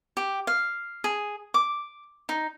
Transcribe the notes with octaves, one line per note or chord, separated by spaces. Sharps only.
G4
F5
G#4
D6
D#4